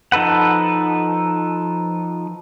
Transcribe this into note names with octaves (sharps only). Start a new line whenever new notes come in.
F3 D#4 A4 B4 F#5